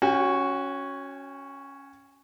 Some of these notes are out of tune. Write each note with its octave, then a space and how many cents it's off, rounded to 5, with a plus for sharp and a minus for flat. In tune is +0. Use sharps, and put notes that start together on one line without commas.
C#4 +0 F#4 +0 G5 +45